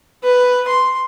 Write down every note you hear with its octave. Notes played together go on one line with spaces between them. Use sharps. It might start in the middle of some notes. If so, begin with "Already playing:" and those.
B4
C6